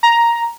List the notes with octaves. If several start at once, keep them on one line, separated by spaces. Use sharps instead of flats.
A#5